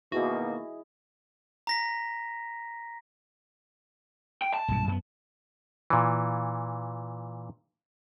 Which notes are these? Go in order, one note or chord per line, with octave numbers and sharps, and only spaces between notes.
B2 D#3 A#3 E4 F#4 G#4 D#5
A#5 A#6 B6
G5
A5
B1 G2 A#2
F#2 A3 B3
A#2 E3